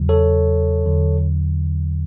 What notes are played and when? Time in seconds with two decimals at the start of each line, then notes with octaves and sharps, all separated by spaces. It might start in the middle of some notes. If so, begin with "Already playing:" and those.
Already playing: E2 C#3 F#3
0.09 A4 C#5
0.86 E2 D3 F#3